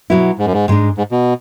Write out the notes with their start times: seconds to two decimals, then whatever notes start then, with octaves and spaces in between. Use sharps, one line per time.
0.10 B2 F#3 B3 E4
0.39 G#2
0.46 F#2
0.53 G#2
0.68 G#2 G#3 D4
0.98 G#2
1.12 B2